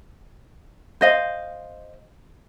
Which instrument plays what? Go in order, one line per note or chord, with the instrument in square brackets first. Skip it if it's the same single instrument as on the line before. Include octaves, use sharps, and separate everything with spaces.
[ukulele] C5 D#5 F5